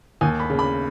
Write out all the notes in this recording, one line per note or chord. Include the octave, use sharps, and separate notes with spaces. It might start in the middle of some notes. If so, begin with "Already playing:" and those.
D#2 G#5
B5
C#3
B5